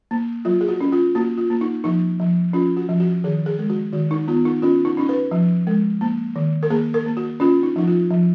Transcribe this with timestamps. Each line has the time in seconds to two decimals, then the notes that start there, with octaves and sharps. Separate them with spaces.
0.11 A#3
0.45 F#3 F4
0.61 G#4
0.68 F#4
0.81 C#4
0.92 F4
1.15 A#3 F#4
1.38 F4
1.50 A#3
1.61 D#4
1.84 F3 D#4
2.20 F3
2.53 C#4 F4
2.77 F#4
2.89 F3
3.00 F#4
3.24 D#3 G#4
3.46 G#4
3.59 G#3
3.70 F#4
3.92 D#3 F#4
4.11 D#4
4.28 B3 F4
4.45 D#4
4.62 C#4 F4
4.85 D#4
4.97 C#4 D#4
5.09 B4
5.31 F3
5.67 G#3
6.01 A#3
6.36 D#3
6.63 A#4
6.70 A#3 G#4
6.94 A#4
7.06 A#3
7.17 F#4
7.40 C#4 F4
7.63 D#4
7.76 F3 D#4
7.87 F4
8.10 F3